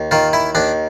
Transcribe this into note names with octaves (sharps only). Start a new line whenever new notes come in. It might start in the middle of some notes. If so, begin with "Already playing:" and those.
Already playing: D#2
D#3 F4
E4
D#2 D4